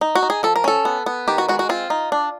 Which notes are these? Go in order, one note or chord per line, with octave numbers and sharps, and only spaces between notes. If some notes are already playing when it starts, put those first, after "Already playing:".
D#4
F#4
D#4
G#4
F3 A4
A#4
C#4 A4
B3
B3
D#3 G4
F#4
G#3 F#4
F#4
C4 F4
D#4
D4